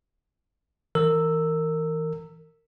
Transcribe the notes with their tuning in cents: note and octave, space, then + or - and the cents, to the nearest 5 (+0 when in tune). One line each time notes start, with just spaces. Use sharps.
E3 -35 A#4 -25 E6 +0